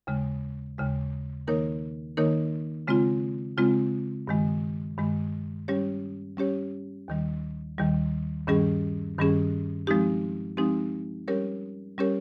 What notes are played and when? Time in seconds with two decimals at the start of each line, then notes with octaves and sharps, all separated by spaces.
0.07 D#2 C#3 G#3
0.78 D#2 C#3 G#3
1.47 D#3 A#3 D#4 A#4 C#5
2.17 D#3 A#3 D#4 A#4 C#5
2.87 C#3 G#3 C4 F4
3.57 C#3 G#3 C4 F4
4.27 G2 D#3 G#3
4.98 G2 D#3 G#3
5.68 G3 C#4 G4 C#5
6.37 G3 C#4 G4 C#5
7.08 D#2 D#3 G3
7.78 D#2 D#3 G3
8.47 G2 D#3 G3 C#4 G#4
9.18 G2 D#3 G3 C#4 G#4
9.87 F3 G#3 C4 D#4 G4
10.57 F3 G#3 C4 D#4 G4
11.28 G3 C#4 G4 A#4 C#5
11.98 G3 C#4 G4 A#4 C#5